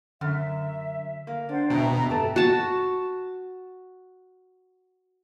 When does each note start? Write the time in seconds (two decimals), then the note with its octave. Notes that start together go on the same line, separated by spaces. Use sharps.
0.21 F#2 D3 E5
1.27 A#3
1.49 D4 C5 F#5
1.70 E2 B2 D4 B4 E5 G5 A#5
2.10 G2 A3 G4 A5
2.36 F#4 A5